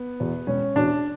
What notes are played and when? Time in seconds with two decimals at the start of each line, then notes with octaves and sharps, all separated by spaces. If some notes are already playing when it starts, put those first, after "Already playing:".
Already playing: B3
0.20 E2 B2
0.47 E1 C#4
0.76 E2 B2 D4